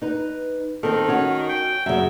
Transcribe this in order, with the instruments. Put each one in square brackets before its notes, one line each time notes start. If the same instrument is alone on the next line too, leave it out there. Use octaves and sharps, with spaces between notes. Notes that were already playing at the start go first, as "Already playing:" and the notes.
[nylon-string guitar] D#4 B4
[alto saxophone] D#3 [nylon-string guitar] C4 A4
[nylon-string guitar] C#4 F#4 C#5
[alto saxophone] G5
[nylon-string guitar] F#2 C#3 [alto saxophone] E5